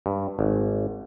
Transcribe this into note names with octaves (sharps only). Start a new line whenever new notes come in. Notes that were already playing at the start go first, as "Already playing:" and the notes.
G2
G#1